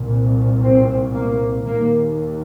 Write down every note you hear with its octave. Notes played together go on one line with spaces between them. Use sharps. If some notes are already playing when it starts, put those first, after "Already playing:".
Already playing: C2 A#2
C4
A#3
D#2 A#3